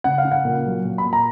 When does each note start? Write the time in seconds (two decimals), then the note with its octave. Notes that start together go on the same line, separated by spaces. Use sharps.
0.04 C#3 F#5
0.18 F5
0.25 C#3
0.32 F#5
0.45 A#2
0.66 F#3
0.85 A#2
0.98 B5
1.06 A#2
1.13 A#5